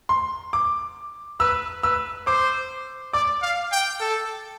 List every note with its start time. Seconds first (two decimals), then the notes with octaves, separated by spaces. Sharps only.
0.09 C6
0.53 D6
1.40 B4 E6
1.83 B4 E6
2.27 C5 D6
3.13 D5 D6
3.42 F5
3.72 G5
4.01 A4